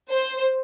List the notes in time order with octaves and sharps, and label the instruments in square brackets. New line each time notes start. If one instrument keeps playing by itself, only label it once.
[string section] C5